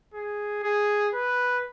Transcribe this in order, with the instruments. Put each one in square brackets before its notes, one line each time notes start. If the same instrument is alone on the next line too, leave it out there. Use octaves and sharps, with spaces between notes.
[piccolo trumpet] G#4
G#4
B4